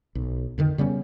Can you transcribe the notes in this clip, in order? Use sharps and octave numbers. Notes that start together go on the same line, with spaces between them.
B1
F2 D3 D#3
C#3 G3 B3 C#4